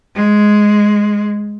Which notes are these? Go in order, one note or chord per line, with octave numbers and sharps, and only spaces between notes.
G#3